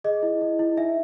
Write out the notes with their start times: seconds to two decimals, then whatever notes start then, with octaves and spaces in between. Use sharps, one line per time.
0.04 G#4 D#5
0.23 E4
0.41 E4
0.59 E4
0.77 D#4 E5